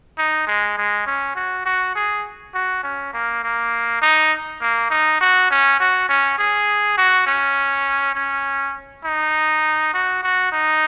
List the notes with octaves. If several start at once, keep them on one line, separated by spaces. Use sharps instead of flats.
D#4
G#3
G#3
C#4
F#4
F#4
G#4
F#4
C#4
A#3
A#3
D#4
A#3
D#4
F#4
C#4
F#4
C#4
G#4
F#4
C#4
C#4
D#4
F#4
F#4
D#4